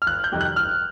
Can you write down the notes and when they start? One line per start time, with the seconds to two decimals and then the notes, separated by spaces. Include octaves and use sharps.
0.02 F6
0.07 G1 F#6
0.24 G6
0.32 F2 C3 D#3 G3
0.41 F#6
0.56 G1 F6